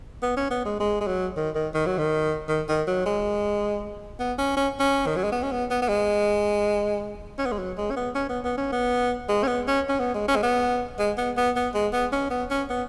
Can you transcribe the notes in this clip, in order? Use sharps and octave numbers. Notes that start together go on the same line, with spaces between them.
B3
C#4
B3
G#3
G#3
G#3
F#3
D#3
D#3
D#3
F#3
D#3
D#3
D#3
F#3
G#3
B3
C#4
C#4
C#4
D#3
F#3
G#3
B3
C#4
B3
B3
B3
G#3
C#4
B3
G#3
F#3
G#3
C#4
B3
C#4
B3
B3
C#4
B3
G#3
C#4
B3
C#4
C#4
B3
G#3
C#4
G#3
B3
G#3
B3
B3
B3
G#3
B3
C#4
B3
C#4
B3